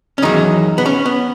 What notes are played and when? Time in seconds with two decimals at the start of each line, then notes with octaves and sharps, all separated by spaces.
0.18 C#4
0.22 E2 D#3 F#3 D#4
0.78 B3
0.86 C#4
1.06 B3